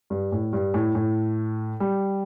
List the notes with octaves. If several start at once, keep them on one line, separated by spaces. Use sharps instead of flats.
G2
A2
G2
A2
A2
G3